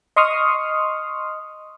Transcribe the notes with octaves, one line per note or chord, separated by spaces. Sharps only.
D#5 C6 C#6 D#6 F6